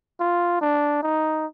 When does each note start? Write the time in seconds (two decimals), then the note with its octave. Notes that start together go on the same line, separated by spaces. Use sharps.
0.20 F4
0.61 D4
1.03 D#4